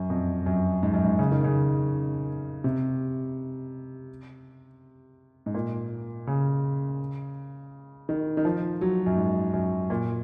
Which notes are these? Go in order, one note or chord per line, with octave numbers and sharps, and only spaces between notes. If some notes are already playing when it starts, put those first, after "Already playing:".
Already playing: F#2
F2
F#2
G#2
F#2
G#2
C#3
D#3
C#3
C3
G#2
A#2
C#3
D#3
D#3
F3
F#3
F#2
G#2
F#2
A#2